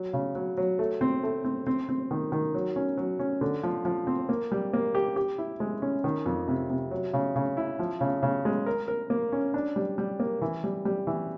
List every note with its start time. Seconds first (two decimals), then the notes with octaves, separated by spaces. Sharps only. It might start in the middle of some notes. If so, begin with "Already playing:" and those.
Already playing: F#3
0.13 C#3
0.35 F#3
0.57 F#3
0.79 A3
1.01 C4
1.23 A3
1.44 C4
1.67 C4
1.89 C4
2.11 D#3
2.32 D#3
2.54 F#3
2.76 C#4
2.97 F#3
3.19 C#4
3.41 D3
3.63 F3
3.85 F3
4.07 C4
4.29 A#3
4.52 G3
4.73 A#3
4.95 G4
5.16 G4
5.38 E4
5.60 G#3
5.82 C#4
6.04 D#3
6.26 F2
6.48 C3
6.70 C3
6.91 F#3
7.13 C#3
7.36 C#3
7.57 E4
7.79 F3
8.01 C#3
8.23 C#3
8.45 G#3
8.66 A#4
8.88 A#4
9.10 A#3
9.32 C#4
9.54 D4
9.76 G3
9.98 G3
10.20 A#3
10.42 E3
10.64 G3
10.85 G3
11.07 E3